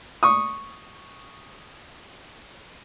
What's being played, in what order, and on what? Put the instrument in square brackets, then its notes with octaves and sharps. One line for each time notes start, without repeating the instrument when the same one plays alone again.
[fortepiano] C#6 D#6